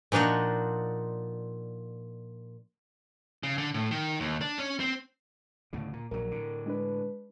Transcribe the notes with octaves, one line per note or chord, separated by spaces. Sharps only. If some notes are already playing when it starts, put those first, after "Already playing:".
A#2 F3 D4 D#4 F#4
C#3
D3
A2
D#3
D#2
D4
C#4
C4
D2 A2 C#3
A#2
A#1 F#3 A#4
A2 D3
G#3 D4 B4